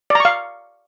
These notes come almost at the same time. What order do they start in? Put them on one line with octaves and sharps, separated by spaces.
D5 A#5 C#6 F5